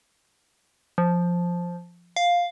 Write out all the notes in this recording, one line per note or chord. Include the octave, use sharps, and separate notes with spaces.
F3
F5